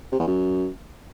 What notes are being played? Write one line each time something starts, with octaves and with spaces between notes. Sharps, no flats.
C3
E2
F#2